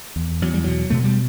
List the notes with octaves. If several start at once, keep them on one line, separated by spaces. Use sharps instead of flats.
E2
E2 F#3
G3
B2 F#3
B2 A3
G3